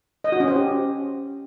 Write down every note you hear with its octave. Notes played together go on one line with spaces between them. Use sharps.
D#5
F#4
C#4
C5
G4